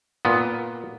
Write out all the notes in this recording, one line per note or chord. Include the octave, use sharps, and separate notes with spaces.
A#2 B3